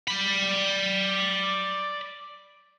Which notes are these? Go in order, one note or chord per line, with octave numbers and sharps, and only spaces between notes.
D5 B5